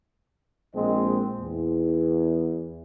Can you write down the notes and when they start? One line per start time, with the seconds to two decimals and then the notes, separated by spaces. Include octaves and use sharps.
0.75 A#1 G#3 C4 D#5
1.40 E2